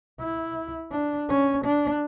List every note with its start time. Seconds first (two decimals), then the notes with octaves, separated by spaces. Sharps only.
0.20 E4
0.91 D4
1.29 C#4
1.64 D4